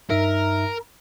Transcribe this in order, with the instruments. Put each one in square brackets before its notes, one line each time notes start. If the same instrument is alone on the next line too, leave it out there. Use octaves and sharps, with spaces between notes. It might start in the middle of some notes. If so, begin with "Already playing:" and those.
[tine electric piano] G2 D#4 E5 [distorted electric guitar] A#4